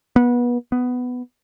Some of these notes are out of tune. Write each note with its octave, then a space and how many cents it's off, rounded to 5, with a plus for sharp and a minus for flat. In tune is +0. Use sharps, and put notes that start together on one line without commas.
B3 -25
B3 +10